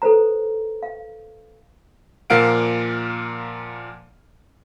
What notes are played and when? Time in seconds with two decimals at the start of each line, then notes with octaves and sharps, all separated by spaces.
0.02 A4 B4 C5 A#5
0.83 F5
2.30 A#2 F3 A#3 F5 F#5 D7